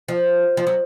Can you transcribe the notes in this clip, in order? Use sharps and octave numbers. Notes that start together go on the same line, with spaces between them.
F3
F3
F#3